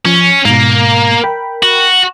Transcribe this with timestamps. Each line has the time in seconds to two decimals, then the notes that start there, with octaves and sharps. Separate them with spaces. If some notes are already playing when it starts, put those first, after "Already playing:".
0.06 F3 C#4
0.45 G#2 B2 A#3
1.24 A#4 G5 B5
1.63 F#4